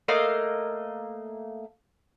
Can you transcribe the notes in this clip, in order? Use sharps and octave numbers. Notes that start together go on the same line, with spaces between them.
A3 A#3 D#5 F5